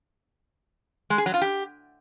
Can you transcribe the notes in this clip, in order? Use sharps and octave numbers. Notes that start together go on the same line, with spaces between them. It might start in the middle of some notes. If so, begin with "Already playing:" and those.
G#3
G#4
F#3
F4
G4